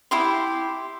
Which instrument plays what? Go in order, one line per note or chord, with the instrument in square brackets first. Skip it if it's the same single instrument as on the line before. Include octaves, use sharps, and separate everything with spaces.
[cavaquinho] E4 G4 C6